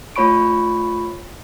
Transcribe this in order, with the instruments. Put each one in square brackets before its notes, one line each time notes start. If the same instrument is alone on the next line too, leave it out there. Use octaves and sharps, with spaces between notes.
[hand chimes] A3 F4 C#5 B5 C#6 D7